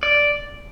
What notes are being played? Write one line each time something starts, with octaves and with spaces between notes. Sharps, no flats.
D5